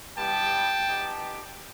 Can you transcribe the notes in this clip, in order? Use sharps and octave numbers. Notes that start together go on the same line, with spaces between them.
G3 B3 E4 G4 G5 A5
B3 D#4 G4